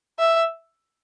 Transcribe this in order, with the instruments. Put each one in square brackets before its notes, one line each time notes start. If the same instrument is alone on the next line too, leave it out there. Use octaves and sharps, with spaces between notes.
[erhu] E5